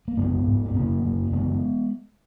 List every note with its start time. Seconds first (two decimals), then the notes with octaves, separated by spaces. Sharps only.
0.08 A#3
0.17 F#2 C#3 G#3 B3
0.47 G#2
0.66 B3
0.74 F#2 C#3 A#3 C#4
1.04 F#2 C#3
1.32 F#2 C#3 G#3 B3